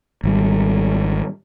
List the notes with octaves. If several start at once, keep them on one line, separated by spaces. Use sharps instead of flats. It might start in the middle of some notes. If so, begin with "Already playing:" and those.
G#1 G3